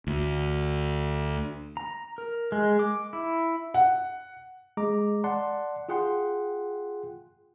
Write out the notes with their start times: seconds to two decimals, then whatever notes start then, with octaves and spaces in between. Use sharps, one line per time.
0.07 D2
1.77 A#5
2.18 A#4
2.52 G#3
2.79 D6
3.13 E4
3.74 F#5
4.77 G#3 A#5 D6
5.24 D5 F#5 A5 C6
5.89 F4 G#4 F#5 G5 C6